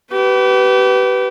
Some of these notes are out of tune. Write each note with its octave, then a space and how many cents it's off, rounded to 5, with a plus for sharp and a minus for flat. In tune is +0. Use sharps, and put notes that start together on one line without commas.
G4 -35 B4 +0